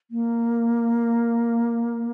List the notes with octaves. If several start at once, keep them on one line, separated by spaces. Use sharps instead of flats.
A#3